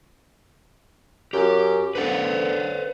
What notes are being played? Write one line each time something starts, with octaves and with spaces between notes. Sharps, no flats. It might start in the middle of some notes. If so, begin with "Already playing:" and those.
F#2 G4
D3 B4 C5 F#5